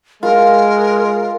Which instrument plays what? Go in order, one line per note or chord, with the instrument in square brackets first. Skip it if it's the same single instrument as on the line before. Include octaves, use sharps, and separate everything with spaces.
[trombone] G#3 [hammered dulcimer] F4 [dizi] A#4